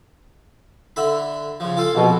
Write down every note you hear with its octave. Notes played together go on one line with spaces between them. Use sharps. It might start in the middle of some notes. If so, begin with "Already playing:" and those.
D3 E5 B5
C#3 F3
F4 A4 F5
A#1 F2 B2